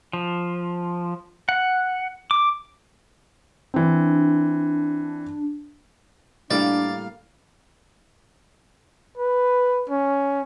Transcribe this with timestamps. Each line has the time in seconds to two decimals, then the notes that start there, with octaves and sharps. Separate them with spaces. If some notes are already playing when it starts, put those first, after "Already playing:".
0.13 F3
1.49 F#5
2.31 D6
3.74 E3 C4 D4
6.51 A2 G3 A#3 D4 D5 F5
9.17 B4
9.89 C#4